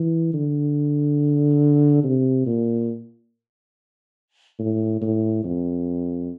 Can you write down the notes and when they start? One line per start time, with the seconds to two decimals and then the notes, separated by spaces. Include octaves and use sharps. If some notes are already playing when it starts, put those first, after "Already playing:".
Already playing: E3
0.33 D3
2.03 C3
2.46 A#2
4.59 A2
5.01 A2
5.44 F2